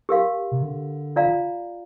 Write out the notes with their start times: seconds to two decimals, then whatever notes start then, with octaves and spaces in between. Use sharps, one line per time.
0.09 G4 A#4 F5 C6
0.52 C3
0.62 D3
1.16 F4 D5 F5 A#5